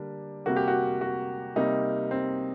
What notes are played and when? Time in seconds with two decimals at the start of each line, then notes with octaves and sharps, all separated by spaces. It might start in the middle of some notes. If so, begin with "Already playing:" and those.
Already playing: D3 G3 A#3 D4
0.46 C3 G3 A#3 F#4
0.56 G4
0.68 F#4
1.01 F#4
1.56 C3 G3 A#3 D#4
2.11 C4